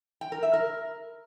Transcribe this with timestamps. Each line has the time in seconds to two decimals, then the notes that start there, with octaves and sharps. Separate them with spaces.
0.21 G5
0.32 A#4
0.43 E5
0.53 A#4